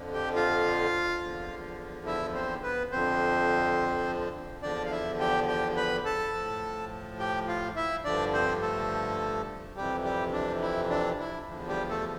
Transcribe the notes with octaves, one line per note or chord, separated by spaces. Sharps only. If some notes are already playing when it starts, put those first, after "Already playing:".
Already playing: F2 D3 F3
G4 G5
F4 F5
E2 D3 F3
E4 E5
C4 C5
B3 B4
F2 D3 F3 C4 C5
E2 D3 F3 D4 D5
F5
E4 E5
G4 G5
G4 G5
B4 B5
A4 A5
A2 F3
G4 G5
F4 F5
E4 E5
G2 D3 F3 D4 D5
C4 C5
A3 A4
F2 C3 E3 G3 G4
G3 G4
D4
E4
D4
E4
E2 D3 F3
G3 G4
A3 A4